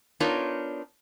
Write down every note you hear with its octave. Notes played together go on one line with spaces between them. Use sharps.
B3 D4 D#4 F4 A#4 C#5